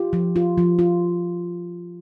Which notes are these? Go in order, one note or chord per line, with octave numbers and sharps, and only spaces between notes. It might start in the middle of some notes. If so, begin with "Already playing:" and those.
Already playing: F4 G4
F3
F4
F3
F4